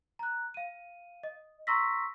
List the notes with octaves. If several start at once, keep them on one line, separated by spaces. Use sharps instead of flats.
A#5 F#6
F5 D#7
D#5
A#5 C6 C#6 E6 A#6 B6